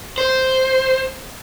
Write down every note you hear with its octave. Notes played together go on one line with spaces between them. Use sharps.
C5